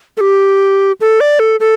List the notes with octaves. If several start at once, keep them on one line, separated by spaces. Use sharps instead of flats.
A4
G4
A4
D5
A4
A4